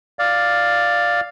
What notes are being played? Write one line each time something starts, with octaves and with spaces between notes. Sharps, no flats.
D5 F5